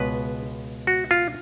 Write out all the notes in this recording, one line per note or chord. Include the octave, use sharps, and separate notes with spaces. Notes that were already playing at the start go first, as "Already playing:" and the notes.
Already playing: C#2 B2 G#3 B3 B4
F#4
F4